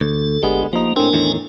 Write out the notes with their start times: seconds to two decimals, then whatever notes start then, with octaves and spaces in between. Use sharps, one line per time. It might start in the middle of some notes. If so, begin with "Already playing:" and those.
0.01 D2 A4
0.43 G1 D3 G#3 B3 G4
0.73 F3 A#3 D#4
0.96 A2 C4 D4 A#4 G#5
1.13 E2 A2 D#3